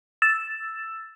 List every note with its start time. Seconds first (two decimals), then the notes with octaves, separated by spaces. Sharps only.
0.22 E6 A6 E7